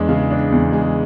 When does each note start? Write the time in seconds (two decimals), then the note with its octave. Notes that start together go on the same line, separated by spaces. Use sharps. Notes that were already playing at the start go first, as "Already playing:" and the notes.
Already playing: E2 G#3 D4
0.09 C#3
0.31 D4
0.52 E2
0.73 G#3